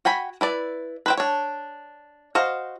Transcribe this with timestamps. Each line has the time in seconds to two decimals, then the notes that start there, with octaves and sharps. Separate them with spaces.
0.05 F#4 G5 G#5 B5
0.41 E4 B4 D5
1.06 B4 C5 G5
1.17 D4 C#5
2.35 F#4 C5 D#5 F5